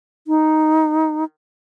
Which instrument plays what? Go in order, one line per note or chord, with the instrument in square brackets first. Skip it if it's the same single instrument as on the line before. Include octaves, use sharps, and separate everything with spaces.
[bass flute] D#4